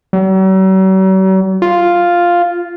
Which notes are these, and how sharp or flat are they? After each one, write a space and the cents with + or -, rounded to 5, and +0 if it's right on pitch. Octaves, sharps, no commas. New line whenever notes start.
F#3 +45
F4 +0